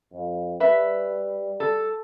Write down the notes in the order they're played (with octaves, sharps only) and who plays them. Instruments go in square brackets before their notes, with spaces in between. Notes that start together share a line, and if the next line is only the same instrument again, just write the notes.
[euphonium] F2
[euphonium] G3 [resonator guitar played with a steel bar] B4 E5
[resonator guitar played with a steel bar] A4